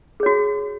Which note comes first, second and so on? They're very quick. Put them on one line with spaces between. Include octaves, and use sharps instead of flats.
G#4 C#5 F#4